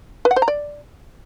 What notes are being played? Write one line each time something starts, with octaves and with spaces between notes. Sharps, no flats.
B4
F#5
C5
A#5
D5